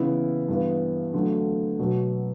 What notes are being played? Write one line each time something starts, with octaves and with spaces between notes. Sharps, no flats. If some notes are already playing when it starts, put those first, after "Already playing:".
Already playing: C#3 E3 B3 E4
G2 E3 B3
D3 F#3 A3
B2 F#3 B3